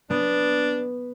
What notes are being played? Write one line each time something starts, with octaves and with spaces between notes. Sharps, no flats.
B3 D4